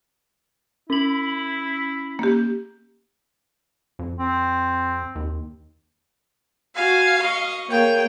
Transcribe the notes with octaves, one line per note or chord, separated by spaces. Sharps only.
C#4 E4 F#7
A#3 G4
F2
C4
D#2
F#4 F5 G#5
D#5 C#6
A#3 G#4 C#5 G5